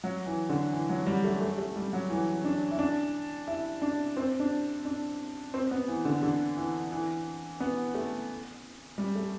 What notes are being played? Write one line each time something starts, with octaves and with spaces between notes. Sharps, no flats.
F#3
E3
D3
E3
F#3
G3
A3
A3
A3
G3
F#3
E3
D4
E4
D4
E4
D4
C4
D4
D4
C4
B3
E3
D3
D3
E3
E3
B3
A3
G3
A3